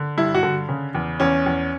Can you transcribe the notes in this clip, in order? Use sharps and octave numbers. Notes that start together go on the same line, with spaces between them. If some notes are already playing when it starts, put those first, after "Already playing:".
Already playing: D3
G2 E4
F#4
D3
C#3
E2
E2 C#4
E2